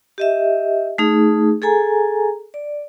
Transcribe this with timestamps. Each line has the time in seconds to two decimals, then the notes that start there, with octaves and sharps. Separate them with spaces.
0.18 G4 D#5 E5
0.98 A3 D#4 G#4
1.62 G#4 A4 G#5 A#5
2.54 D5